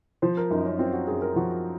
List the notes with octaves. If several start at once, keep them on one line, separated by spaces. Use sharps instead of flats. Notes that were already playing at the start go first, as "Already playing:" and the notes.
F3 C5
A#4
F#2 D#4
C#4
C4 F4
F#4
F#2 G#4
A#4
F3 F#4